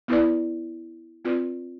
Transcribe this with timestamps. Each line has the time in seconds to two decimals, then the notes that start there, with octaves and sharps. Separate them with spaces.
0.08 B3 E4 B4 D5
1.25 C4 F4 B4 D5